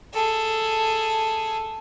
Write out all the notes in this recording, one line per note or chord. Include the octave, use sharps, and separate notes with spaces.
G#4 A4